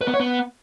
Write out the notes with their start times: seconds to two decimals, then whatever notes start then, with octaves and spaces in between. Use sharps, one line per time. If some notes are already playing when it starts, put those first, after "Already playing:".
0.01 B4
0.07 B3
0.14 C#5
0.20 B3